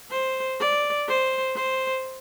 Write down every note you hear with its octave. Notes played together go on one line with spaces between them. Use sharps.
C5
D5
C5
C5